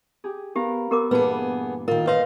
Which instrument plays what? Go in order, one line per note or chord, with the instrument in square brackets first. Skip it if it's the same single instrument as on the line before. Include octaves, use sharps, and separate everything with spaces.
[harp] G4 G#4
[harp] B3 A#4 F5 [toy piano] G4
[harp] B3 E6 [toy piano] G4 A#4 D6
[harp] G2 A#2 E3 [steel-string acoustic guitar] B3 G#4 [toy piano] B4
[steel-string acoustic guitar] D#3 F4 [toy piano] A#4
[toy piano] B4 C#5 C6 [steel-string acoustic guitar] D#5 F5